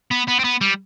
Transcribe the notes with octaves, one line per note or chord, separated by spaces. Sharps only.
B3
B3
C4
B3
G3